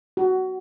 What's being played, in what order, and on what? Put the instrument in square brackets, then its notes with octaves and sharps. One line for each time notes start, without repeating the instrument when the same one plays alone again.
[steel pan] F#4